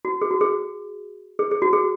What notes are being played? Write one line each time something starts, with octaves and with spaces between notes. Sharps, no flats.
F#4
G#4
F#4
G#4
G#4
G#4
F#4
G#4